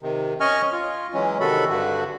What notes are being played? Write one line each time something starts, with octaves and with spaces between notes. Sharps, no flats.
C3 D#3
C#4 D#5 G#5 C#6 F6
F4
E3 F#3 G#3 C#4
C3 D#3 F#4 A4 B5
G2 D3 F#4